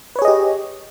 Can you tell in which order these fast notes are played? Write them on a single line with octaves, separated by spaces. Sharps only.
B4 C#5 G#4 D#5 G4